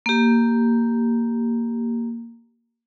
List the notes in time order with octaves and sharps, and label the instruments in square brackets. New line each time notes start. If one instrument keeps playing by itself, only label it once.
[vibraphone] A#3 G4